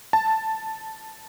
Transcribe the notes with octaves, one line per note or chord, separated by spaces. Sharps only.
A5